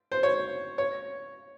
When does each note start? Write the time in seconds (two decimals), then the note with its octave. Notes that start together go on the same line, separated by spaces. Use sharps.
0.12 C5
0.23 C#5
0.78 C#5